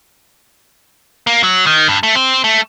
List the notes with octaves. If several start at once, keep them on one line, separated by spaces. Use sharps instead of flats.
A#3
F#3
D#3
G2
A3
C4
A3